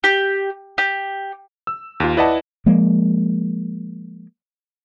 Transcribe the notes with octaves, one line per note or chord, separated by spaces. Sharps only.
G4
G4
E6
D#2 F4
E4 B4 D5 D#5 F#5 A5
F3 G#3 A#3